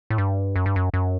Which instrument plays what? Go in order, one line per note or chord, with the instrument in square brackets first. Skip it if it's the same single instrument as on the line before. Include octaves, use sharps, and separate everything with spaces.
[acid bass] A2
G2
F#2
G2
F#2
F#2